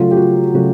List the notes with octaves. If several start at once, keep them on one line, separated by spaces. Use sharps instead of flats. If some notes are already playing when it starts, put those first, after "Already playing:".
Already playing: C#3 F#3 A3 F4
G4
F#4
C#3 F#3 A3 F#4